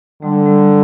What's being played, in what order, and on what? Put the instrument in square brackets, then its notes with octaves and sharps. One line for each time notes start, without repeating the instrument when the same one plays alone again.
[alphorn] D3 [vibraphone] G3
[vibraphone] G3